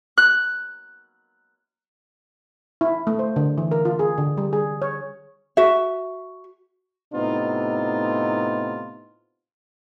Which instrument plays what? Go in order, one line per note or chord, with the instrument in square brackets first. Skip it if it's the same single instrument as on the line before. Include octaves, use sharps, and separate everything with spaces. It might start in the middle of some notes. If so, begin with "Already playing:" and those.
[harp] F#6
[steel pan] E4
A3
C5
D3
E3
A#4
F4
G#4
D3
G3
G#4
C#5
[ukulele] F#4 E5
[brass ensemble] A2 C3 B3 D#4 F4